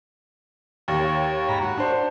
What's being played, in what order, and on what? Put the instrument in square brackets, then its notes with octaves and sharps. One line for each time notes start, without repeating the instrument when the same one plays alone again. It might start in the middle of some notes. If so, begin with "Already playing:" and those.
[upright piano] D#2 [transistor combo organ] C#5
[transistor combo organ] G#2 A#5 B5
F#4
[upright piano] D4 C5